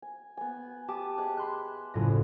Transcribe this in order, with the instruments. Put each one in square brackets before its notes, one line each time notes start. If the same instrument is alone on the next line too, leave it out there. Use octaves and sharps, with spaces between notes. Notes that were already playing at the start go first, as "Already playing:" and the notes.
[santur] G#5
B3 G#5
[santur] G4 [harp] A5 D6 D#6
[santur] G#4 D#5 E5 [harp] F#6
[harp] B5 C6 F#6
[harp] F#1 A2 A#6 [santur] F3 F#4 E6